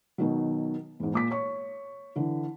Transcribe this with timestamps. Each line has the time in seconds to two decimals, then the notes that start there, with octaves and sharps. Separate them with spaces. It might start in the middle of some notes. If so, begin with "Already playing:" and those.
0.18 B2 D#3 F#3
1.00 E2 G#2
1.14 A#2 D6 B6
1.31 C#5 C#6
2.16 D3 E3